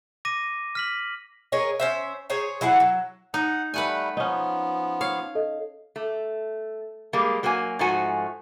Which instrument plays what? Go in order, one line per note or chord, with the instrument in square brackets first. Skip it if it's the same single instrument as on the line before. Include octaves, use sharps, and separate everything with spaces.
[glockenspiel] D6 A#6 D#7
F6 B6 F#7
[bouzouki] G#4 A#4 C#5 D#5
C#4 C5 E5
G#4 C5 C#5 A#5
F#3 E4 G#4 F#5
F#3
[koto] D#4 [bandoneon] F#5
[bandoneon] G3 A3 [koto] B4 F#5 G#5
[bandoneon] F3 B3 [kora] C#4 D#4
[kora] C#5 [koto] F5
[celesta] A4 D#5
[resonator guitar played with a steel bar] A3
G3 G#3 A#3
F#3 A#3 F#4 B4 G#5
G#2 F3 A3 F#4 G#5